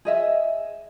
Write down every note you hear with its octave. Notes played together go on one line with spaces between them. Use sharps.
G#4 D#5 E5